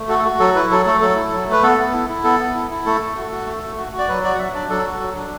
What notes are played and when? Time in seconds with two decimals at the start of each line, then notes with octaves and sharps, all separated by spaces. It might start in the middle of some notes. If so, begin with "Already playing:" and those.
Already playing: A3
0.09 F#4 A4
0.19 A4
0.24 F#4
0.39 F#3 A4
0.55 E4 B4
0.71 F#3 A4
0.86 A3 A4
1.01 F#3 A4
1.16 E4
1.32 F#3
1.47 A3
1.52 B4
1.63 B3 A4
1.78 B3
1.93 E4
2.09 E4
2.24 B3 A4
2.40 B3
2.55 E4
2.70 E4
2.86 A3 A4
3.00 A3
3.16 F#4
3.32 F#4
3.46 A3
3.63 A3
3.78 F#4
3.92 F#4
3.99 D5
4.08 F#3 B4
4.24 F#4 D5
4.35 F#5
4.39 F#3 E5
4.54 D4 D5
4.70 F#3 A4
4.85 F#4
5.01 F#3
5.16 D4